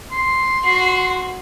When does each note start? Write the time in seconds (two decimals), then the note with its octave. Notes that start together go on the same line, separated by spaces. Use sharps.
0.12 C6
0.64 F#4